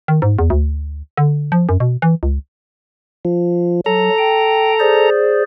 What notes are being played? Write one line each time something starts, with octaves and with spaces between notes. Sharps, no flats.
D#3
G#2
E2
D2
D3
F3
F#2
B2
E3
C#2
F3
F#3 A4 A#5
G5
G#4 C5 D5